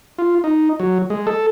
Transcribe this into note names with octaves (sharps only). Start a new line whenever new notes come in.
F4
D#4
F#3
G#3
A4